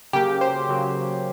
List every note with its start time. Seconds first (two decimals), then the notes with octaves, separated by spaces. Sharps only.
0.13 C#3 F#3 A#3 G4
0.41 C5
0.69 C#3 F#3 A#3